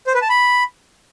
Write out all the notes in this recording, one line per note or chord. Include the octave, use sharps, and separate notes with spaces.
C5
B4
A5
B5